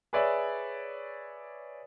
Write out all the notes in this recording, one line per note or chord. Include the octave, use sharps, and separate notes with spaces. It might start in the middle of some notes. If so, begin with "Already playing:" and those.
G#4 B4 C#5 D5 E5